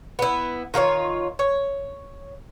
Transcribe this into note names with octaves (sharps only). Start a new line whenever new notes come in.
B3 E4
D#3 F4 A4 C#5
C#5